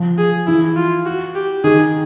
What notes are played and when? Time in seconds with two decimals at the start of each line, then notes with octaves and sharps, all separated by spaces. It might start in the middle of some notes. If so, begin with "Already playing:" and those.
Already playing: F3
0.18 G#4
0.47 E3 E4
0.77 F4
1.06 F#4
1.35 G4
1.64 D#3 G#4